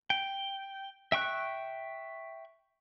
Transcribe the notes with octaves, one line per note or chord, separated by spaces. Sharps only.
G5
E5 G5 C#6 F#6